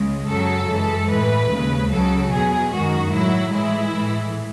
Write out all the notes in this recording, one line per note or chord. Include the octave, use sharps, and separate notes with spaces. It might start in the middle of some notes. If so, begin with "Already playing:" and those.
Already playing: C#2 C#3 G#3
F#2 C#3 F#3 A4
F#2 E3 G#3
A2 E3 G#3 B4
D#2 C#3 G#3
C#2 C#3 F#3 A4
E2 B2 F#3 G#4
F#2 D#3 G#3 F#4
A2 F#3 E4
A2 E3 G#3 E4
A2 E3 G#3